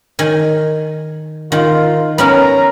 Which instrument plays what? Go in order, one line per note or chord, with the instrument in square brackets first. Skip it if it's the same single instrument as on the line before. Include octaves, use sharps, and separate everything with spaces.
[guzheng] D#3 G#5
[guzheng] D#3 [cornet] F4
[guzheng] B3 C#4 A#4 [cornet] A#5